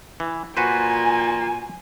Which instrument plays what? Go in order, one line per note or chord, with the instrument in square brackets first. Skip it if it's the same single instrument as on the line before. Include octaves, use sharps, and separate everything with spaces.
[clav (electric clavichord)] E3
[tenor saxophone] A#2 [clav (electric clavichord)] F#4 B4 C5 [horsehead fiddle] G#5